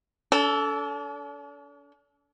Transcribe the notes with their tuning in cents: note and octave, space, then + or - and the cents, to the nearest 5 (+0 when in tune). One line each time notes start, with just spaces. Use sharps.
D4 -45 A4 +0